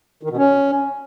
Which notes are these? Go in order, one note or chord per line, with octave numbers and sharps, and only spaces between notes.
D#3
B2
C#4